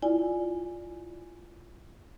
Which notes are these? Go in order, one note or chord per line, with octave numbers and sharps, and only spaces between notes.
E4 F4 D5 G#5